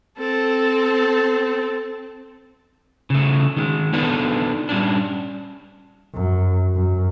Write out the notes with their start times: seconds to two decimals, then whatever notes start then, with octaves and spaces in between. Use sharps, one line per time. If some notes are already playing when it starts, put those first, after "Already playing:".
0.18 C4 A4
3.10 C#3 A3
3.56 D#3 G3 G#3
3.93 B3 D4 D#4 F4 A4 B4
4.69 G3 C#4 D4
6.14 F#2
6.74 F#2